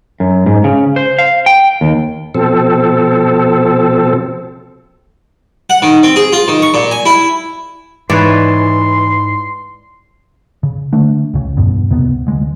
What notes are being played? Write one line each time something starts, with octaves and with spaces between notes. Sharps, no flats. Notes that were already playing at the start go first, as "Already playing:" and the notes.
F#2
G#2
C#3
C5
F5
G5
D#2
B2 F3 C4 A4
F#5
D#3
C4
G#4
F4
D#3
C#6
A#2
G#5
E4
G#2 E3 B4 C#5 D5 C6
C#3
D3 A3 D4
C#2 C#3
E2 G2 B2
C#2 C3 B3
D2 G#3